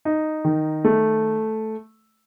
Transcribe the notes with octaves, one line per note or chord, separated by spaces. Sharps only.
D#4
D#3
A3